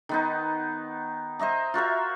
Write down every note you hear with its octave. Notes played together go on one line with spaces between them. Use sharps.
D#3 B3 D#4
C5 D#5 E5 A#5
F4 F#4 A#4 E5